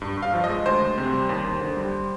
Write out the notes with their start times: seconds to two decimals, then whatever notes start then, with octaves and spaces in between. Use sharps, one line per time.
0.01 G2
0.17 G2
0.22 F5
0.34 F3
0.44 D#5
0.49 G#3
0.66 D2 C5
0.82 D2
0.98 C3
1.13 G3
1.29 D#2
1.44 D#2
1.61 D3
1.77 G3